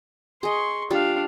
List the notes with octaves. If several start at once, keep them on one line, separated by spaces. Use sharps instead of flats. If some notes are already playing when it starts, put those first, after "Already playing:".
G#4 D#5 C6 C#6
G3 D4 F4 F5